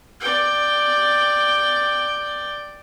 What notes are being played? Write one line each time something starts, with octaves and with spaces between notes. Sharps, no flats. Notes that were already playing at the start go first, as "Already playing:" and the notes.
D5 G5